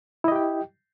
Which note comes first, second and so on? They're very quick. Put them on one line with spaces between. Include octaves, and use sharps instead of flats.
E4 D#5 G4 G5